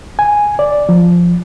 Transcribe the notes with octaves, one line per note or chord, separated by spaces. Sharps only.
G#5
D5
F3